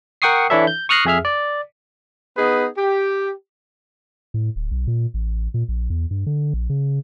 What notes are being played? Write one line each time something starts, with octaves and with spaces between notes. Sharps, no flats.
A#4 F#5 G5 C#6 D#6 C7
E3 D4 E4 A4 C#5 E5
G6
C#6 D#6 F6 F#6 A#6 C7
F2 G#4 E5 F6
D5
B3 D#4 G#4 B4
G4
A2
D1
B1
A#2
A1
A#2
A#1
E2
G2
D3
A#1
C#3